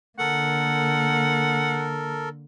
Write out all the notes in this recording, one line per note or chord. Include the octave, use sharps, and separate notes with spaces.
D3 A#3 A4 A#4 F#5